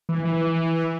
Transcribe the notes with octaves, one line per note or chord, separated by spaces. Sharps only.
E3
E3